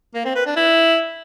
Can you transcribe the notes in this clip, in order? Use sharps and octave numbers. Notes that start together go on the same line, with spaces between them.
A#3
C4
B4
D4
E4